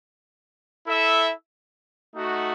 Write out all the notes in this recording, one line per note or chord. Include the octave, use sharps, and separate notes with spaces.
E4 A4 E5
A3 D#4 F#4